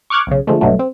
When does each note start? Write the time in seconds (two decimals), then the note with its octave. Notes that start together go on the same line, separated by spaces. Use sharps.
0.10 C#6 D6 F6 F#6 G#6
0.27 B1 C#3
0.47 D3 F3 G#3 A3
0.61 A#1 G2 B2 F#3 A3
0.79 C4